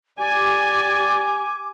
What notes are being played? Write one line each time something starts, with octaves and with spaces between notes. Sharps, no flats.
G4 D5 G#5 D6